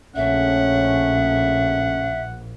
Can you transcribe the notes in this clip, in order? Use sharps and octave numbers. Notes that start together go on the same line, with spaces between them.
A#1 C#3 A3 C#4 E5 F#5